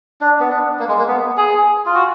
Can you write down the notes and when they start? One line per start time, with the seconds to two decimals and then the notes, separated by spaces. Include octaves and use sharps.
0.21 D4
0.40 B3
0.50 D4
0.79 A#3
0.88 G#3
0.98 A#3
1.08 B3
1.37 G#4
1.86 F4
1.94 F#4